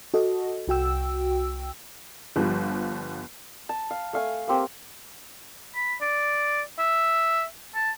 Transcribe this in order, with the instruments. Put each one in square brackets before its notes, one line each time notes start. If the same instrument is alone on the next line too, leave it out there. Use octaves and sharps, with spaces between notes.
[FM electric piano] F#4 A4 D#5
C2 F#4 G5 E6
[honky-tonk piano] G1 F3 G3
[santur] A5
F5
A3 F5 G#5
A#3 C4 G4
[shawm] B5
D5
E5
A5